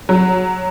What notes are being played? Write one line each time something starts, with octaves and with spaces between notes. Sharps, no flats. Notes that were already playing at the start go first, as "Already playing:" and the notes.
F#3